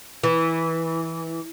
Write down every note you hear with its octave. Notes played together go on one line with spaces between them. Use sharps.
E3